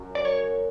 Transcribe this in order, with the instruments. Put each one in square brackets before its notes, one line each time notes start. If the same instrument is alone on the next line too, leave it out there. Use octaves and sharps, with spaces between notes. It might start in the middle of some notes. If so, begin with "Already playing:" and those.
Already playing: [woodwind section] F#2
[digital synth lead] D5
C#5